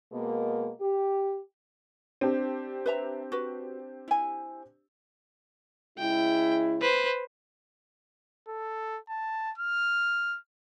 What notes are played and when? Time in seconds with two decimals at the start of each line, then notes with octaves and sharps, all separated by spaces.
0.12 B2 G#3 A#3
0.80 G4
2.21 C4 D4 G4
2.86 B4 E5 A#5
3.32 F#4 B4
4.08 E4 G#5
5.99 C#3 G#3 E4 G5
6.81 B4 C5
8.48 A4
9.09 A5
9.58 F6